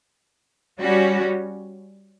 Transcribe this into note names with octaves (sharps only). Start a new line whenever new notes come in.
G3 C#4 F#4